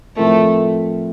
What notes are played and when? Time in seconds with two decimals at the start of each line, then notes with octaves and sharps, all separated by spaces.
0.16 A2 F3 A3 C4 E4 A#4